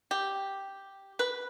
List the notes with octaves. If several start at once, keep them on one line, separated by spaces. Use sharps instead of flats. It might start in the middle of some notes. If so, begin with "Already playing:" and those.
G4
B4